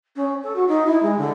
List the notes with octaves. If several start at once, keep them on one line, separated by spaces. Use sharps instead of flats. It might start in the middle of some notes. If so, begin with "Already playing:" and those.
C#4
A4
F#4
D#4
E4
G#3
D3